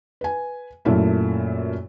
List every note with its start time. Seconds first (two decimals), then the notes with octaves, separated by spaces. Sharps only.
0.21 B4 G#5
0.85 F#2 A#2 A3 A#3 E4 F4